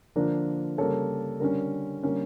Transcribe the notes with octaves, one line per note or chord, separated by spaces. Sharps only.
D3 F3 A#3 D4 A#4
C#3 G3 A#3 A4 C#5
D3 G3 C#4 A#4
D3 G3 A#3 C#4